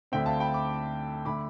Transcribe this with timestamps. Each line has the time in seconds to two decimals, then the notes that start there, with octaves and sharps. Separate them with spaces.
0.12 D2 D3 A3 C4 E5 G5
0.26 F5 A5
0.40 G5 B5
0.54 B5 D6
1.25 D3 A3 B5 D6